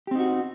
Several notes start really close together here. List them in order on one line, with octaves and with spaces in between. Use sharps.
G4 C4 D#4 F#4